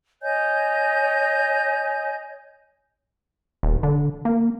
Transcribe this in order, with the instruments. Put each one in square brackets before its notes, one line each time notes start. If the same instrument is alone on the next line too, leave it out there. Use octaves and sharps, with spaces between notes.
[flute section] C#5 D#5 G#5 G6
[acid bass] D#1
D3
A#3